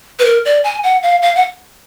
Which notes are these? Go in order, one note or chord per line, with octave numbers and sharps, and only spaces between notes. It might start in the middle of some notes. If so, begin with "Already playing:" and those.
B4
A#4
D5
G#5
F#5
F5
F5
F#5